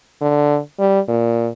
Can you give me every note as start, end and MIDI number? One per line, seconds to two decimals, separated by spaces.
0.21 0.58 50
0.79 1.00 55
1.08 1.49 46